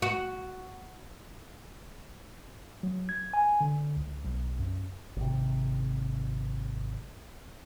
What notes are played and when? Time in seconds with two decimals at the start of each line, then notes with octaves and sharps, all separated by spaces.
0.02 F#4
2.83 F#3
3.09 G#6
3.34 G#5
3.61 D3
3.97 C#2
4.25 B1
4.59 F#2
5.16 G#1 C3